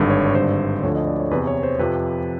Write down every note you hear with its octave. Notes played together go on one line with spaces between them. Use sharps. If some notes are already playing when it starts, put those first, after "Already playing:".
Already playing: G#1 G2 D3
C#5
G#1 G2 D3 C5
D2 D3 F3 C#5
D#5
D5
C#5
E2 C3 E3 B4
C#5
C5
F2 C3 F3 B4